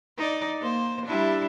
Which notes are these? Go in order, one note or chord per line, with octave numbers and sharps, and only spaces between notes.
D#4 D5
A#3 C5
G3 D4 E4